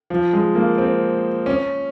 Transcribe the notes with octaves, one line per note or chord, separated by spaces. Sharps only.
F3
G#3
A#3
C4
C#4